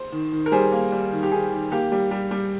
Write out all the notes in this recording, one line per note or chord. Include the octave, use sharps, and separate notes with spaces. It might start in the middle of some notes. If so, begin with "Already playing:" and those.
Already playing: C5
D#3
D#3
A#4
G3 G#4 C5
A#3
G3
D#3
G4
D#3 G#4
D#3
A#3 G4
G3
G3
G3